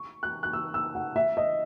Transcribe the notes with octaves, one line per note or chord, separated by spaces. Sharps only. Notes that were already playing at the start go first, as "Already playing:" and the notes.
Already playing: C#6
F#6
F#6
E6
E6
F#5
E5
D#5